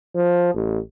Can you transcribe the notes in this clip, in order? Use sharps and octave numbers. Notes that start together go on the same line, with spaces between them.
F3
A1